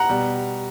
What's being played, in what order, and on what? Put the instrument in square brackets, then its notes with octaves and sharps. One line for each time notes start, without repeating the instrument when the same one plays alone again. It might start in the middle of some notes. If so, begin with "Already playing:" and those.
Already playing: [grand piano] F#5 A#5
B2 G3